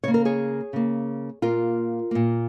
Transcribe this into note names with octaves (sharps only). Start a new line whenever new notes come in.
C#3 A#3 C#5
A#4
G#4 C#5
C#3 A#3
A#2 A#3 F4 A#4
A#2 A#3